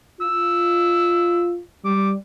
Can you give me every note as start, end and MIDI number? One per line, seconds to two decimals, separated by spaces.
0.21 1.59 65
0.21 1.49 88
1.85 2.14 55
1.85 2.10 86